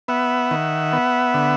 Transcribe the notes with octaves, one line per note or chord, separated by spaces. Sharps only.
B3 E5 F#5
D#3
B3
D3